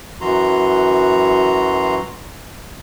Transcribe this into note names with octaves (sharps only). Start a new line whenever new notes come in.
F#2 E3 F#4 A#5 C6